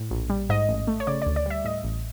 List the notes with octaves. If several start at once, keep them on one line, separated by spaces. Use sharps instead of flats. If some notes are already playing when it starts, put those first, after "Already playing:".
Already playing: A2
A#1
G3
G#2 D#5
A1
A3
C#5
C#3 D5
D2 D5
D5
G3 E5
A2 D#5
A1